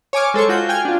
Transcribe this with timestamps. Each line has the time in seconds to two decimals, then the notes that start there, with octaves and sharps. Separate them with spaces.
0.13 C#5 G#5 D6 F6
0.34 G#3 A4 C5 C#6
0.49 F4 F#4 G6
0.69 G5 G#5 F6 G#6
0.85 D4 F4